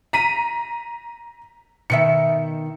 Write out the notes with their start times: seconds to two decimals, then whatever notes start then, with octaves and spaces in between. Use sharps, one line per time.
0.13 A#5 B6 D#7
1.90 B2 D#3 E5 C#7